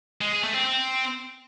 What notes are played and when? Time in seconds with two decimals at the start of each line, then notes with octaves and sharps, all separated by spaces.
0.21 G#3
0.32 G#4
0.43 A3
0.54 C4
0.65 C4